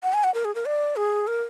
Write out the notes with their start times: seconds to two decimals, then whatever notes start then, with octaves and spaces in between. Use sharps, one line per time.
0.03 F#5
0.14 G#5
0.24 F#5
0.34 A#4
0.45 G#4
0.55 A#4
0.66 D5
0.96 G#4
1.27 A#4